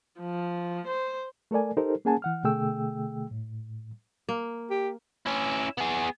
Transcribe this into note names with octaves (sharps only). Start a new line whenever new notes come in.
F3
C5
A3 A4 A#4 D5 G#5
D#4 G4 A4 A#4 C5
A#3 C#4 G#4 F#5 G#5 A5
E3 F#5 F6
B2 D3 A3 G#4 G5 E6
A2
A#3
G4
C#4 E4
B3 G#4